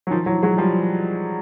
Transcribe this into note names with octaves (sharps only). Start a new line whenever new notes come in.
F#3
D#3 F3
E3 F#3
F#3 G#3
F3 G3